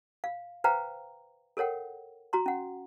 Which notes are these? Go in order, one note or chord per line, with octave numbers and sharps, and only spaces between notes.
F5
B4 C5 F5 G5 A#5
A4 A#4 C#5 F#5 G5
F#4 A#5 C6
C#4 F#5